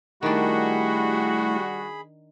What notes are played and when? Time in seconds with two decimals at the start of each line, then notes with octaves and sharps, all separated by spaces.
0.23 D#3 G3 A3 D4 E4 F#4 G#4 B5